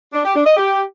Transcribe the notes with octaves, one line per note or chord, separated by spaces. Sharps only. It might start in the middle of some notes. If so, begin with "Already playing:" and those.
D4
G4
D4
D#5
G4